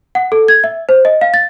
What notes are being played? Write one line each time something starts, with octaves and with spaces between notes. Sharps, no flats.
F#5
A4
G#6
E5
C5
D#5
F5
A6